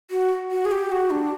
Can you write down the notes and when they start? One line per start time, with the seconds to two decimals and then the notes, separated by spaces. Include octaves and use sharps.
0.11 F#4
0.51 F#4
0.65 G#4
0.72 G4
0.92 F#4
1.10 D4